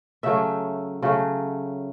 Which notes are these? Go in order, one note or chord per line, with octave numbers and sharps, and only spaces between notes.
C#3 F#3 A3 E5
C#3 F#3 A3